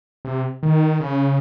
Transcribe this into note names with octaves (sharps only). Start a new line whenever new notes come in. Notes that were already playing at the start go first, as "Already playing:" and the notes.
C3
D#3
C#3